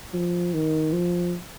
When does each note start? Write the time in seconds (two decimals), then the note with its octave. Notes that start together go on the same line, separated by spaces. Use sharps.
0.14 F3
0.54 D#3
0.93 F3